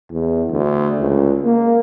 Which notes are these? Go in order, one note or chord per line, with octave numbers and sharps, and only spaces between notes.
E2
D2
C#2
A#3